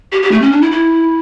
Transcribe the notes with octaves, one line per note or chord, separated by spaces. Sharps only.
G4
G4
A3
C#4
D4
E4
E4